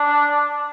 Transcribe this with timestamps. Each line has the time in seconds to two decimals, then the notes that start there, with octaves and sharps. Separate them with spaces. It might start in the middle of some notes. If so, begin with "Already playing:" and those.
Already playing: D4